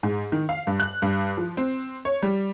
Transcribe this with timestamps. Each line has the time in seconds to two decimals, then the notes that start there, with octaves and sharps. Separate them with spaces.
0.03 G#2
0.32 D#3
0.49 F5
0.67 G2
0.80 F#6
1.02 G2
1.37 F3
1.57 C4
2.05 C#5
2.22 G3